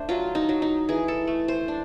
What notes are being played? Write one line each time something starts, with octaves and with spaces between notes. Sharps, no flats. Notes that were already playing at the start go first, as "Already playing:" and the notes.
Already playing: A3 D4 C5
F#3 F4
D#4
F#3
D#4
E3 G#4
A4
A3
C5
D4